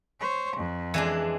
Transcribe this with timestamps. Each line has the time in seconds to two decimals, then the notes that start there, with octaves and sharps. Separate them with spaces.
0.20 C5 C#5
0.56 F2
0.94 E3 G#3 D4